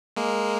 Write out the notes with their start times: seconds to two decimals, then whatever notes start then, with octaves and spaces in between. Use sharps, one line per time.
0.17 G#3 A#3